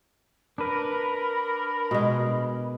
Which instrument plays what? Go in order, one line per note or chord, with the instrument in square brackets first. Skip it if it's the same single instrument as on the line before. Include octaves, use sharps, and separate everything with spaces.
[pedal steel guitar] D4 B4 [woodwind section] A#4 [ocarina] B5
[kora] B2 G#3